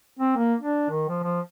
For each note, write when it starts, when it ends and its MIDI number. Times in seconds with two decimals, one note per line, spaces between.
0.19 0.34 60
0.36 0.55 58
0.61 0.86 62
0.90 1.08 51
1.09 1.22 53
1.23 1.40 53